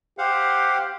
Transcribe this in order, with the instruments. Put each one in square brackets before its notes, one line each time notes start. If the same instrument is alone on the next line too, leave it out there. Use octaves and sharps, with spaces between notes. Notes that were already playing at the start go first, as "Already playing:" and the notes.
[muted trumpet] G4 [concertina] C5 F5 F#5